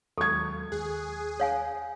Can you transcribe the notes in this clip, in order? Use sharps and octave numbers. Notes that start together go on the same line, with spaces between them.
D#2 F#3 G#3 A4 C#6 G#6
D#2 G#4 F#6
C#5 F5 G#5